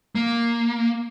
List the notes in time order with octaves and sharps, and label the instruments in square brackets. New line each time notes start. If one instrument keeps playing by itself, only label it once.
[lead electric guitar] A#3